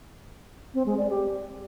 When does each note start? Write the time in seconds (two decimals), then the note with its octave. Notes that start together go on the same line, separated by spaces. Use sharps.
0.74 C4
0.86 G#3
0.98 D5
1.10 G4